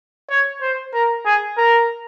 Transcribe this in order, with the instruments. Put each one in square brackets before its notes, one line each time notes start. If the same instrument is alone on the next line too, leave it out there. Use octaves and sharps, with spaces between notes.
[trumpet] C#5
C5
A#4
G#4
A#4